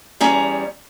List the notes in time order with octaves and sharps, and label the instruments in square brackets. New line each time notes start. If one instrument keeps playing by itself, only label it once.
[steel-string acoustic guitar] E2 G3 C#4 G#4 A#5